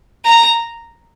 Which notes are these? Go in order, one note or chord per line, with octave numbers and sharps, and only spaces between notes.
A#5